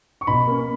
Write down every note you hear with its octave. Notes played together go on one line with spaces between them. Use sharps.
C#6
B2 B5
A#3 C#4